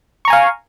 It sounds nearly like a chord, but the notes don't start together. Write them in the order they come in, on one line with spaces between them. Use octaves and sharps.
C#6 A#5 G#5 F5